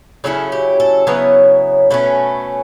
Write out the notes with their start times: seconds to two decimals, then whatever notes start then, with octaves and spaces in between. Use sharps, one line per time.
0.24 C#3 F#3 C#4 E4 A4
0.52 G4
0.80 A4
1.07 C#3 F#3 B3 E4 C#5
1.90 B2 A3 C#4 B4